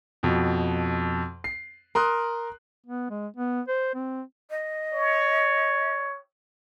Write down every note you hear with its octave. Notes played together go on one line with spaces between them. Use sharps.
F2 B2
C7
A#4 C6 D#6 F#6
B3
G#3
B3
C5
C4
D#5
C#5